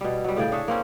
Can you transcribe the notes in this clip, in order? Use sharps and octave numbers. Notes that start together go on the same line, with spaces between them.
B2 G3
F#3 G3
A2 C#3 D5 G5
D4 G#4 C#5 E5
A#3 C4 C#4